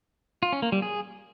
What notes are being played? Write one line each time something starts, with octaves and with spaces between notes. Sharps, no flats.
F4
C#4
A#3
G3
G#4